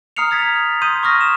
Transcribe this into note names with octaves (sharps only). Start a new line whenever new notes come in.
A#5 D#6 F6 C7 C#7 F7
D#6 G#6 A6 B6
C6 D#6 G6 D#7
C#6 D#6 F6 A#6
E7